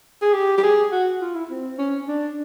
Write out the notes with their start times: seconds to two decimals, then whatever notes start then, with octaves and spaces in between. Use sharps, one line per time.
0.22 G#4
0.33 G4
0.58 G4
0.63 G#4
0.92 F#4
1.21 F4
1.35 E4
1.50 C4
1.78 C#4
2.08 D4